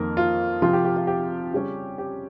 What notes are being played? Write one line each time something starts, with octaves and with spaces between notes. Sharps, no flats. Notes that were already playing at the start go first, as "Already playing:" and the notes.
Already playing: F2 D#3 A#3 A#4
F4
C3 F3 C4 F4
G4
G4
F4
G4
C#3 G3 C#4
G4